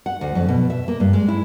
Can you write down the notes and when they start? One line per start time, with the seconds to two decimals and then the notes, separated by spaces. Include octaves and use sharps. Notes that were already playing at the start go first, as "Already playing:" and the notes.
0.06 F#5
0.21 D2
0.35 F2
0.48 B2
0.70 E5
0.88 A#3
1.00 G2
1.13 G#3
1.28 E4